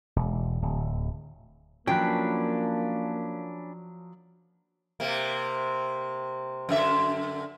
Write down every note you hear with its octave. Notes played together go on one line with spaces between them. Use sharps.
E1
D1
F3 F#3 A#3 C#4 D4 B4 G5
C3 A#3
F#2 D3 E5